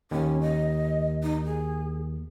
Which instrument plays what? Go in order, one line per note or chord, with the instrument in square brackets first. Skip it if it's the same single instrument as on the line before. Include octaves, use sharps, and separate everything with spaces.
[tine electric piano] D#2 [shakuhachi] C#4
[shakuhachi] D#5
D#4
G#4